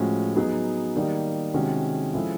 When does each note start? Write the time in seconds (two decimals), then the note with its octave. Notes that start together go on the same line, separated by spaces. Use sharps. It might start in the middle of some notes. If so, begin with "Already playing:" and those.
Already playing: A2 F3 G#3 C#4 F#4
0.36 F#3 B3 D#4 G#4
0.96 D#3 G3 A#3 D#4
1.54 C3 D#3 G#3 C#4 F#4
2.13 F3 G#3 C#4 E4 A4